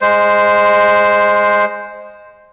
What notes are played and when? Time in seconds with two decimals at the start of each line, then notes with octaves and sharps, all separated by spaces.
0.01 G#3 C5